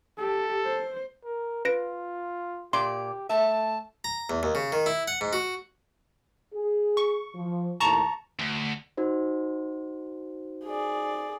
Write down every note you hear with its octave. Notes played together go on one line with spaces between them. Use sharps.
G4 A4
C5
A#4
F4 B4 A#6 D7
A#2 G4 D5 C6
A3 E5 A5
A#5
E2
D#2
C#3
D#3
E4
F#5
G#2
F#4
G#4
C#6
F3
D#2 A2 A5 A#5 C#6
D2
D#4 F#4 C5
G#4 D5